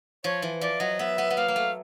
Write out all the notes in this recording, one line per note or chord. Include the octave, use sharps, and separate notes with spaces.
F3 C#5
E3
F3 D5
F#3 D#5
B3 E5
B3
B3
A#3 F5
A#3
A3